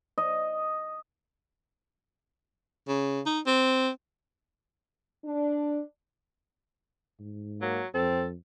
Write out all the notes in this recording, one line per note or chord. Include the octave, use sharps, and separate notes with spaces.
D#5
C#3
D#4
C4
D4
G#2
F#3 A#3
F2 C4 A4